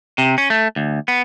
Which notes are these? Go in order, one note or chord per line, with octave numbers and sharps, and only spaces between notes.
C3
C#4
A3
D2
B3